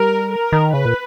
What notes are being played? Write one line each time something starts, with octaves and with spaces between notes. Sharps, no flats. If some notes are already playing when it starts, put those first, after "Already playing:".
Already playing: G3 A#4
A#4
D#3
C#3 B4
A#2